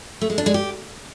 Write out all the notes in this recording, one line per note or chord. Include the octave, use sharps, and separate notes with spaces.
A3
G#3
D4
G#3
G4